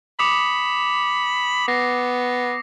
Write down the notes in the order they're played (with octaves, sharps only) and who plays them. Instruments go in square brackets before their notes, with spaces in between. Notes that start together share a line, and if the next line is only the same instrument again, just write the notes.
[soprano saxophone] B5 [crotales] D6 D#6 C#7
[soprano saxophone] B3 [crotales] A#6 C7